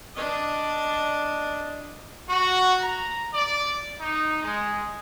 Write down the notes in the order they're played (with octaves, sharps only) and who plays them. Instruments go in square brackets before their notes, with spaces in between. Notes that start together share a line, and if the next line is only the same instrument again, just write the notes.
[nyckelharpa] D4 D#5
[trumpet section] F#4
A#5
D5
D#4
G#3